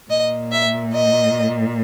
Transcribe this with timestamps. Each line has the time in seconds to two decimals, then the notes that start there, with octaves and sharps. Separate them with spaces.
0.10 A#2 D#5
0.52 E5
0.94 D#5